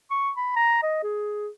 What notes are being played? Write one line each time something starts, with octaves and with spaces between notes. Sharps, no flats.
C#6
B5
A#5
D#5
G#4